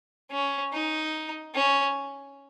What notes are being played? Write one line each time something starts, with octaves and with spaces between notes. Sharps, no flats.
C#4
D#4
C#4